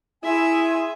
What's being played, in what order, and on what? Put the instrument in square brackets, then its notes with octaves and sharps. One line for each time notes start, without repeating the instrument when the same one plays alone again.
[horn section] E4 [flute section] G#4 G#5 C6 [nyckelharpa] E5